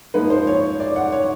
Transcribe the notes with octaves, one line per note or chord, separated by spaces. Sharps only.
G#2 F3 A#3 D#4 B4
C5
C#5
D5
F#5
C#5